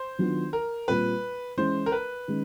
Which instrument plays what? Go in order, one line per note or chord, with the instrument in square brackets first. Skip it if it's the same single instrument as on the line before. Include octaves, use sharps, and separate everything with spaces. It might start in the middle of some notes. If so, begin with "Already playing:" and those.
Already playing: [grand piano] C5
[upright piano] D#3 F#3 B3 D4 F4
[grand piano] A#4
[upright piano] A#2 G3 C4 F4 [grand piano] B4
[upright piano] E3 G#3 C#4 E4 [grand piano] C5
[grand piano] A#4
B4
[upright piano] D#3 G#3 C#4